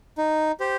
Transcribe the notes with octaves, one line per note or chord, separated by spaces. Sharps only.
D#4
G4 C5